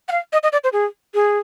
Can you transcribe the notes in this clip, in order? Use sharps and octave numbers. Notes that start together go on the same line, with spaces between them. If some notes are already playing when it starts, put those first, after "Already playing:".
F#5
F5
D#5
D#5
D5
C5
G#4
G#4